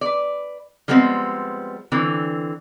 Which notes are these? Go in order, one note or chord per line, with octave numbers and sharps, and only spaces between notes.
B4 D5
F3 G3 G#3 B3 C4
D3 E3 C4